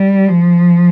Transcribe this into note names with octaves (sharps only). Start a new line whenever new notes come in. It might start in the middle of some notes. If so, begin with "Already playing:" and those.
Already playing: G3
F3